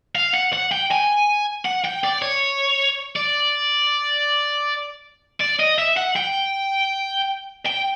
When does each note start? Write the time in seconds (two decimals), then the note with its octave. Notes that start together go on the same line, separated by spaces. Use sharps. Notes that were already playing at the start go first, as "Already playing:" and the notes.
0.15 F5
0.34 F#5
0.53 F#5
0.72 G5
0.91 G#5
1.65 F#5
1.85 G5
2.04 D5
2.22 C#5
3.16 D5
5.40 D5
5.60 D#5
5.78 E5
5.97 F#5
6.16 G5
7.66 G5